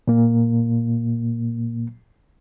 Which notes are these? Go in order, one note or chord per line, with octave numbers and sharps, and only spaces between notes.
A#2 A#3